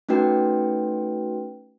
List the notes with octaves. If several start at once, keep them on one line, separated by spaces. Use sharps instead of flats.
A3 C#4 D#4 F#4 B4 G5